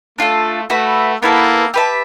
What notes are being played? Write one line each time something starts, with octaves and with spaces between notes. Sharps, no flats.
A3 D4 F4 A4
A3 F#4 B4 E5
A#3 B3 E4 A4
G4 B4 E5 A5